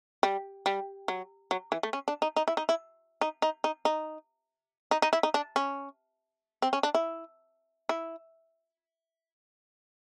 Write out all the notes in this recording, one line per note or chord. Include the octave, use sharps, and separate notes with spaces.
G3
G3
F#3
F#3
E3
A3
C#4
D4
D#4
D#4
E4
D#4
E4
D#4
D#4
D#4
D#4
D#4
D#4
E4
D#4
D4
C#4
C4
C#4
D4
E4
E4